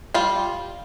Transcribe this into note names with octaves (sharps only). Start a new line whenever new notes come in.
G3 F4